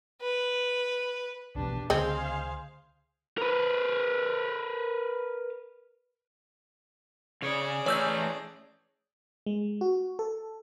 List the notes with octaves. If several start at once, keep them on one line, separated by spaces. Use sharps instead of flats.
B4
A#1 E2 B2 D4 G4 B4
C#2 D3 G#3 C4 G#4 C5 F5
A#4 B4
C#3 G#4 C#5 D5
E3 A3 C#4 C#5 E6 G6
G#3
F#4
A4